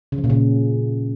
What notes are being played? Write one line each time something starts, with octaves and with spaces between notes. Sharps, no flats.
C#3
F3
A#2
C#3